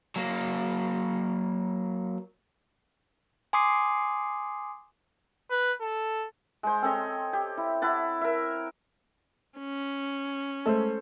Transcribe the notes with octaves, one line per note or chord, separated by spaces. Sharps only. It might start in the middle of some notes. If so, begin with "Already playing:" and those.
F#3 A#3
G#5 C6 D6 D#6 C7
B4
A4
G#3 C5
C4 A4 C#5 D#5
G4
E4
E4 F#5 A5
A#4 E5
C#4
G#3 A3 A4 C5 E6